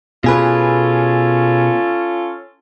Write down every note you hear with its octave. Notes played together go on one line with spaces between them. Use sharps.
B2 C#4 F4 G#4 A4 B4